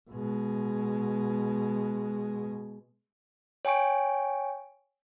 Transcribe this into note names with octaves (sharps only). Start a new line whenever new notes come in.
B2 G#3
C#5 G5 G#5 C#6 D7